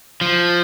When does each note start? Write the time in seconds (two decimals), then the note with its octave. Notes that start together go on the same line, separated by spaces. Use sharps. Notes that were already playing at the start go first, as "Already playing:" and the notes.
0.21 F3